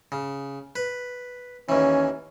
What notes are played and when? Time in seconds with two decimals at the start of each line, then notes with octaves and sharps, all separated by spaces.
0.12 C#3
0.76 B4
1.69 D#2 E3 C#4